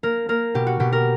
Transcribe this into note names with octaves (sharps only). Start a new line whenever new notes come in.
A#3 A#4
A#3 A#4
B2 G4
F#4
B2 G4
A#4